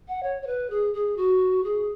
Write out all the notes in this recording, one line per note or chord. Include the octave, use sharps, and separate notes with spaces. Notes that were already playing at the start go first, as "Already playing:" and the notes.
F#5
C#5
C#5
B4
G#4
G#4
F#4
G#4